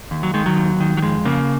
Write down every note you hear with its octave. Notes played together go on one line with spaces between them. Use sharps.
D#2
F#3
D#3 G#3
F#3
D#2
D#3
F#3
F2 G#3
C#3 A#3